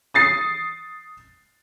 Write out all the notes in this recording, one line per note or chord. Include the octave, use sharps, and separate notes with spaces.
D#6 A6 C7 C#7